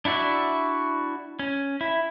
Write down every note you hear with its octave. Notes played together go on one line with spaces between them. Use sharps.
D4 E4 F#4 D5 E5
C#4
E4